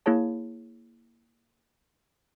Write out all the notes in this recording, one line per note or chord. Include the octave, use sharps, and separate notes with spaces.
A#3 E4 G#4 C#5 A5